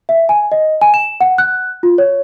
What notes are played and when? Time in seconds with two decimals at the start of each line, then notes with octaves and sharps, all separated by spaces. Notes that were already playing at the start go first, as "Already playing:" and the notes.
0.09 E5
0.29 G#5
0.52 D#5
0.81 G#5
0.94 E7
1.21 F#5
1.38 F#6
1.83 F4
1.98 C#5